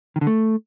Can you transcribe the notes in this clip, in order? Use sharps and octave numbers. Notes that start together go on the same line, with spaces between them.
D#3
D3
A3